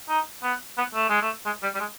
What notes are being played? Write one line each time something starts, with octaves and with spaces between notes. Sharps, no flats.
D#4
B3
B3
A3
G#3
A3
G#3
G3
G3
G#3